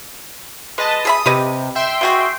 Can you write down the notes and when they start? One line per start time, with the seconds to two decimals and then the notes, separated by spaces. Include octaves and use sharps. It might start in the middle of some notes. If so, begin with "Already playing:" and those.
0.78 G#3 B4 D#5 A5
1.05 G#4 E5 B5 D#6
1.26 C3 G4 B4 D#5
1.75 E5 G5 C6
2.01 B2 F#4 G#4